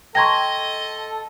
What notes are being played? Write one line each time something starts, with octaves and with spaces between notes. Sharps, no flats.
A4 D#5 G5 A#5 C6 C#6 G#6 A#6